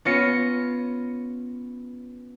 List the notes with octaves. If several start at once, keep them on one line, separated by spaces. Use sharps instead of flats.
B3 C#4 F4 A#6 C#7